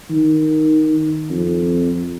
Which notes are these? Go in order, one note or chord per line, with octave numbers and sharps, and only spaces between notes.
D#3
F2